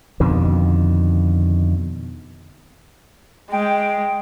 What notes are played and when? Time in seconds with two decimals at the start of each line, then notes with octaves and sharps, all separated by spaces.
0.20 F2 B2 D3 D#3
3.50 G#3 G5